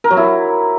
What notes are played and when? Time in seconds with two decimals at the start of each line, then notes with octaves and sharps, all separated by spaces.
0.04 A#4
0.11 F#3
0.17 E4